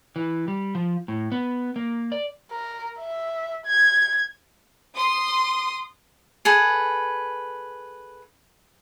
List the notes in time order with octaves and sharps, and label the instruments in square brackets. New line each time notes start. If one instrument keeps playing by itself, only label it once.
[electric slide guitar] E3
G3
F3
A2
B3
A#3
D5
[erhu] A#4
E5
G#6
[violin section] C6 D#6
[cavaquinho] G#4 A4 B4